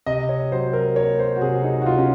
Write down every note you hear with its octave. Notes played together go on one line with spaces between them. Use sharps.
C3 D#5
C#5
F#3 C5
A#4
A#3 C#5
C5
F#4
C3 G#4
D#4
F#4
C3 F4
C#4